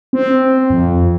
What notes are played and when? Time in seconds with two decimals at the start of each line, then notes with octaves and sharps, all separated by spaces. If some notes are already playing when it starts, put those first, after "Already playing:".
0.13 C4
0.70 F2